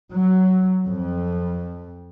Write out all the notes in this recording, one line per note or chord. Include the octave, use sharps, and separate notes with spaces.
F#3
F2